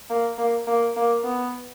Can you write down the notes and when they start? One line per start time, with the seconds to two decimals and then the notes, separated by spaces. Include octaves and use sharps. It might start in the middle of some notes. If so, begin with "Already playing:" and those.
0.10 A#3
0.38 A#3
0.67 A#3
0.96 A#3
1.24 B3